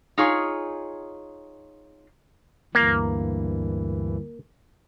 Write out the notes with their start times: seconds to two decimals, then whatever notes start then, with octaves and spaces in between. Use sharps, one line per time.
0.18 D#4 F4 G#4 C#5
2.75 D2 G2 E3 A#3